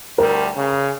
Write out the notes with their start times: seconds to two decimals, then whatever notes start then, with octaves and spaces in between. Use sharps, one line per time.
0.18 D2 G3 A#4
0.56 C#3